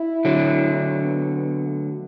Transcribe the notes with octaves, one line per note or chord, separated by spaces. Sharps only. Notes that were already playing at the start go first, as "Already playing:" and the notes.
Already playing: E4
D3 F#3
D4
B3
B3
A3